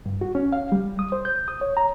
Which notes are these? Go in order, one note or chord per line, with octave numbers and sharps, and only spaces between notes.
G2
F#4
C#4
F5
G3
D#6
C5
G6
D#6
C#5
A#5